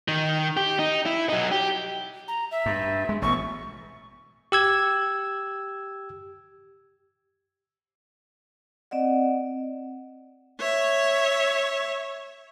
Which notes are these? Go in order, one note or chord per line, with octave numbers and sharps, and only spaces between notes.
D#3
G4
D#4
E4
F#3 D#4
G4
A#5
E5
G2
G#3
A1 B2 C#6
G4 E6 G#6
C4 D5 D#5 F#5
C#5 E5